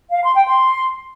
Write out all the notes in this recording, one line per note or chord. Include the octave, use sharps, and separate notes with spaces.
F5
C6
G5
C6